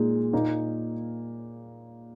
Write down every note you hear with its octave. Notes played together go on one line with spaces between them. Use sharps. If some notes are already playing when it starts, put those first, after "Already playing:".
Already playing: A#2 G#3 D#4
A#2 A#3 D#4